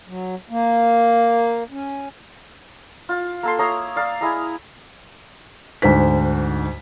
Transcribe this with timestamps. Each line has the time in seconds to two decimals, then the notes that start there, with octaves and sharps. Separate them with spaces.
0.08 F#3
0.50 A#3
1.71 C#4
3.09 F4
3.43 A#3 A4 C6
3.59 C#5 E5 A#5 D#6
3.96 D5 F5 A#5
4.21 E4 G#4 D#5 A#5
5.82 D2 G#2 C5 B6